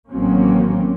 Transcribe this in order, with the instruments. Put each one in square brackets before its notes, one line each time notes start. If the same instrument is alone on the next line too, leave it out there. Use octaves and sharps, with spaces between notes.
[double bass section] A1 D#3 F#3 A#3 C4 C#4